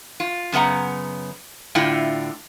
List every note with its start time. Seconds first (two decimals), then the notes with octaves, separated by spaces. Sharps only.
0.20 F4
0.52 F#2 C#3 B3 F#5 A#5
1.75 A2 D3 E4 F4 G5